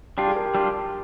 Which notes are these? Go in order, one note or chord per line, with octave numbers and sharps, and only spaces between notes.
G3 D4 F4 G4
G#4
A#4
G4
G3 D4 F4